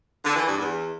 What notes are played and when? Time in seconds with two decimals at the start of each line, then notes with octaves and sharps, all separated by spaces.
0.25 D3
0.36 E3
0.47 G2
0.58 E2